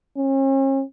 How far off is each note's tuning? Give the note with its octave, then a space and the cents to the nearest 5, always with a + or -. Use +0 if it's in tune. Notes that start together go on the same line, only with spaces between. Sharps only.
C#4 -40